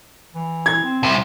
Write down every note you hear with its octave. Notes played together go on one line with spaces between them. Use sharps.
E3
G#6
C4
C2 C3